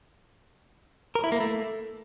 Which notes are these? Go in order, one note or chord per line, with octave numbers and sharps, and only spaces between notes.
A#4
E4
A#3
A3